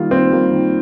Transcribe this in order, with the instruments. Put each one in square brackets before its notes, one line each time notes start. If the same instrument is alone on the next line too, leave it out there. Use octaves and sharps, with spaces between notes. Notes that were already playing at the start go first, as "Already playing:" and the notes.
Already playing: [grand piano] D#3 G3 A#3 F4
[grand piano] D#3 [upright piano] C4
[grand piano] G3 A#3 F4
D#3